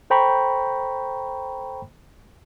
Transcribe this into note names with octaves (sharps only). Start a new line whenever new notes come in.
A4 C5 G5 A#5 B5 C#6